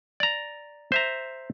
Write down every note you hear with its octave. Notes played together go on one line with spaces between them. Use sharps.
D5 A#5
C5 E5 A#5